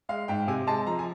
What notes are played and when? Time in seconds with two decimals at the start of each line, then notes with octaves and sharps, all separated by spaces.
0.09 G#3 F5
0.28 G#2 G5
0.48 C3 G#5
0.67 G#3 A5
0.86 F3 A#5
0.99 G#5